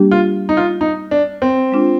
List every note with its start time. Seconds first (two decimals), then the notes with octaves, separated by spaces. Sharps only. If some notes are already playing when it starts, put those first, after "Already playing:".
Already playing: G3 A#3 D4 G4
0.11 F4
0.49 D#4
0.57 F4
0.81 D#4
1.11 D4
1.42 C4
1.72 G#3 D4 F4